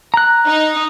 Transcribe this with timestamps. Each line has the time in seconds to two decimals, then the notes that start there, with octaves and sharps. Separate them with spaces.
0.14 A#5 F#6
0.48 D#4